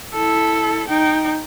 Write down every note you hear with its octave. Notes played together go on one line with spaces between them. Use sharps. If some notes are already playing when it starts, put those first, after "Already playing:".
E4 A4
D#4 G5